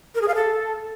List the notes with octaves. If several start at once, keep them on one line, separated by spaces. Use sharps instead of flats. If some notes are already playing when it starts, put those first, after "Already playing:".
A#4
G#4
F5
A4